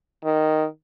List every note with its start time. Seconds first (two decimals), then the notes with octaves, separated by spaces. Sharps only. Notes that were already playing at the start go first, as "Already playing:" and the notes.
0.24 D#3